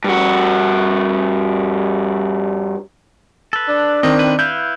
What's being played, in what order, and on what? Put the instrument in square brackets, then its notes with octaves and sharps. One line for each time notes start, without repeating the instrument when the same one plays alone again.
[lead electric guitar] G2 F#4
[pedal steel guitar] A4 B4
[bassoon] D4
[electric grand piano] D#3 C4 [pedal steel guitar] D#5
[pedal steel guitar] B4
[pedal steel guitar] E4 B4 F5 [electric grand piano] G6